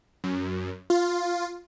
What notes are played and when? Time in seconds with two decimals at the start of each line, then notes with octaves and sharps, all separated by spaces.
0.24 F#2
0.90 F4